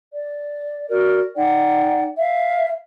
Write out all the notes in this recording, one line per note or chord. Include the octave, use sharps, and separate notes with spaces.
D5
F#4 A#4 D5
D#4 D5 F#5 G5
E5 F5